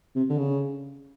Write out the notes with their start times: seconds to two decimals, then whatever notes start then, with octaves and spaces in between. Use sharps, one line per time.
0.15 C3
0.29 D3
0.38 C#3